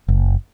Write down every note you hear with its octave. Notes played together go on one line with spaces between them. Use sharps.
F#1